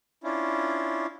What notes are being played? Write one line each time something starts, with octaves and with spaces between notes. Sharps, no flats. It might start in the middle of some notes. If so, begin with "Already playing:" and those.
C#4 D4 E4 F4